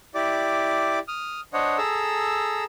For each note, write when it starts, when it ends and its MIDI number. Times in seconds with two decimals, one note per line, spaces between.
0.15 0.99 64
0.15 0.99 67
0.15 0.99 74
0.15 0.99 86
1.08 1.41 87
1.08 1.41 89
1.53 1.77 62
1.53 1.77 72
1.53 1.77 73
1.53 1.77 75
1.53 1.77 78
1.78 2.64 68
1.78 2.64 69
1.78 2.64 82
1.78 2.64 88